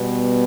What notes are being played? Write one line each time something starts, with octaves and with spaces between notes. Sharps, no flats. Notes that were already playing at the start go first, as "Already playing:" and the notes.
Already playing: B2 G3 B3